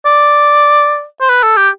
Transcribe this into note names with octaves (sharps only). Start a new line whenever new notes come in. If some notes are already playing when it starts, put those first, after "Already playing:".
D5
C5
B4
A4
G4